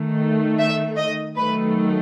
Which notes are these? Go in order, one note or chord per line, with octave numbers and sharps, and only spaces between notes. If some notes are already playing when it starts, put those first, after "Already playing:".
Already playing: D#3 A3
E5
D#5
D#3 F#3 A3 B4